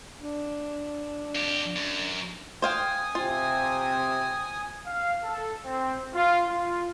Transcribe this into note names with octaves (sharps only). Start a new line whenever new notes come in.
D4
F2 G4
F#2
C5 F5 G5 G#5 D#6
C3 C4 F4
F5
A4
C4
F4
F4